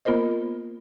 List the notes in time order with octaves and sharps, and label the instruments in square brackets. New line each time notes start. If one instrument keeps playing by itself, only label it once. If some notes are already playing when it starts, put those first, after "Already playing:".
[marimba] A#3 B3 F4 A#4 C5 D#5